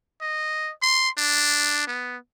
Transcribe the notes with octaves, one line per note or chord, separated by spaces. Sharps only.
D#5
C6
D4
B3